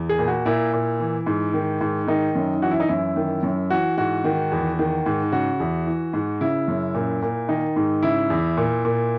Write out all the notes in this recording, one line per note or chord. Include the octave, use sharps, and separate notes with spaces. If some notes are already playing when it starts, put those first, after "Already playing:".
Already playing: E2
G#4
A#2
F#4
A#2 E4
A#2
E3
G#2
D#3
G#2
D#3 D#4
F#2
E3 F#4
E4
D#4
F#2 E4
D#3
F#2
E3 F#4
G#2 F#4
D#3
E2
D#3
G#2
C#3 F#4
E2
E3
G#2
C#3 E4
F#2
A#2
A#2
D#3 D#4
G#2
C#3 E4
E2
A#2
A#2